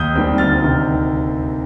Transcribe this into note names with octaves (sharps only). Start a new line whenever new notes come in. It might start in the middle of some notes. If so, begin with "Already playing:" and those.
Already playing: D#2 D#6 G6
D#3 G3 C4
D2 F6 A6
C3 D#3